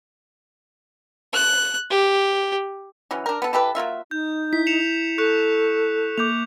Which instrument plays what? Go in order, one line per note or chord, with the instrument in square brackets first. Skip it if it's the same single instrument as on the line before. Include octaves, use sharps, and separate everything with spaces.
[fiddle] F#6
G4
[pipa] E3 F#3 C#4
D4 A#4
B3 A4
E3 G4 A4 B4
F#3 A#3 F4 E5
[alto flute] D#4 [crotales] G6
[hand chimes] E4 [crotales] B6
[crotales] C#7 E7 F7
[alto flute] A4 [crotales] C#6 F#6 C#7
[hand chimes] A#3 D6 [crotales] G6 F7